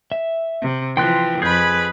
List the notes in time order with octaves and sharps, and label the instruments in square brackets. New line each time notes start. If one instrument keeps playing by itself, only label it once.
[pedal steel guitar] E5
[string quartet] C3
[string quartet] E3 F3 [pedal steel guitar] G5 C6 F#6
[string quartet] F2 B4 B5 [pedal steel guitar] G#4 G6